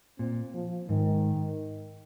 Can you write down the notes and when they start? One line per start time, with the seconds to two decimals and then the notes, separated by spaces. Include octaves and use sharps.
0.19 A#2 C4
0.54 F3
0.89 G#2 D#3